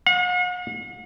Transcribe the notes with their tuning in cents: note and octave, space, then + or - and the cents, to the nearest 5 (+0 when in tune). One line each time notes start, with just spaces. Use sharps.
F#5 -45